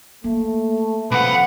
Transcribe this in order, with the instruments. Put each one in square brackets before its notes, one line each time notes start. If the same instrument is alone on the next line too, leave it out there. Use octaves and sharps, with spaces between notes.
[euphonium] A3 [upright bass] A#3
[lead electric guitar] C2 F#5 [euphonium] F2 [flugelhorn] B4